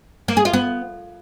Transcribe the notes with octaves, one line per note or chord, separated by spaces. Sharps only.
A#3
G#4
F4
B3